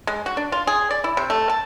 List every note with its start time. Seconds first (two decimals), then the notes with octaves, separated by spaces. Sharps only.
0.07 G#3
0.26 F#4
0.37 D4
0.52 F4
0.67 G#4
0.91 D5
1.04 E4
1.17 C3
1.30 A3
1.49 A5